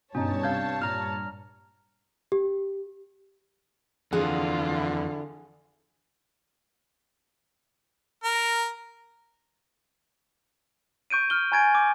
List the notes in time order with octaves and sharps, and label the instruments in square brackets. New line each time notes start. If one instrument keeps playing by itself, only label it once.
[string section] G2 C#5 A5 [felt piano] B2 D#4 [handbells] C#4
[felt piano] C2 G#6 [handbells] F5 G6
[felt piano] A#2 G3 [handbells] A#5 F6
[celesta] G4
[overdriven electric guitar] F2 E3 [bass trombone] D3 [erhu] F4 [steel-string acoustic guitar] G#4 F#5
[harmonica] A#4
[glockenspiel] C#6 G6 D7 D#7
F6 G7
G#5 A#5 C#6 G#6 A6 D7
D6